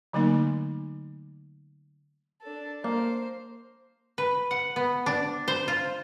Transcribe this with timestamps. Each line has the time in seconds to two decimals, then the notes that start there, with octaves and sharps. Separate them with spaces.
0.13 D3 F#3 A3 A#3 D#4
2.42 D4 A4
2.84 A#3 C5
4.18 B4
4.51 F#5
4.76 B3
5.06 D4
5.48 C5
5.68 F4